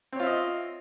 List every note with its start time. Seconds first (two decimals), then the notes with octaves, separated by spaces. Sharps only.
0.12 C4
0.16 C#5
0.20 F4
0.23 E5
0.27 D#5